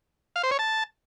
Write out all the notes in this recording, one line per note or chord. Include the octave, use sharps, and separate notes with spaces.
F5
C5
C#5
A5